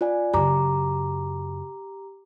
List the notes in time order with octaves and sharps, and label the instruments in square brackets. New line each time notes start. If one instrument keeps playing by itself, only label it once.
[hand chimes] F4 D5 G#5
[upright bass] F#2 C#3 [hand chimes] G4 A#5 D6